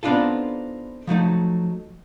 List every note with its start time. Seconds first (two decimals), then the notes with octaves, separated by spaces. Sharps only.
0.03 B3 C4 D4 D#4 F4 A4
1.07 F3 F#3 A3 D#4